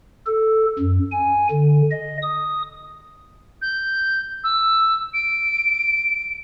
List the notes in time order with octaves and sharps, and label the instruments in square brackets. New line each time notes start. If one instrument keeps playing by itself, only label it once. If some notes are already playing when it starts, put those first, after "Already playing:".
[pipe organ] A4
F#2
G#5
D3
D#5
D#6
[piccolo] G6
E6
D7